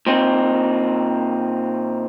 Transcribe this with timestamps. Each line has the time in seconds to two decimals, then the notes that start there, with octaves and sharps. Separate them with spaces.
0.07 A#2 C4 D#4